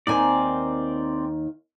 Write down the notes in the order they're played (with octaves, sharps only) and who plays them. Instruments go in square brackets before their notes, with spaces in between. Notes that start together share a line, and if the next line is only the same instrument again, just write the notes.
[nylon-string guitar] D#2 D#3 G#5 [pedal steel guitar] C4 D5